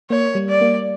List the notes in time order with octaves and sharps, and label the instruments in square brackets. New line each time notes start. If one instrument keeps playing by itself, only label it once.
[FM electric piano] A#3 [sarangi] C#5
[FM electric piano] G3
[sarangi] D5
[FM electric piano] A#3